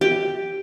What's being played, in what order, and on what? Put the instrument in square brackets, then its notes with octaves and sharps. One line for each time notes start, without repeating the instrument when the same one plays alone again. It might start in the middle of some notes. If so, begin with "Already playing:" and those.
[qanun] G4